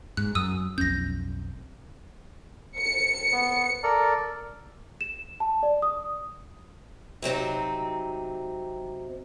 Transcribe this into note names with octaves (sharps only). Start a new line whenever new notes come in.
G#2 F#6
F#2 D#6 E6 D#7
B1 F2 C#4 G6 A#6
C#7
B3
A4 A#4 D5
E7
A5
D5
D#6
C3 F#3 C4 D#4